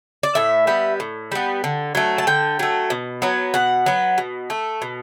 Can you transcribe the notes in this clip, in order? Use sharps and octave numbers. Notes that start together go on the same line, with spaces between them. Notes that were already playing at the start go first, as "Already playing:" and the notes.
D5
A2 E5
G3 B3
A2
G3 B3
D3
F#3 A3
A5
D3 G5
F#3 A3
B2
F#3 B3
B2 F#5
F#3 B3
B2
A3
B2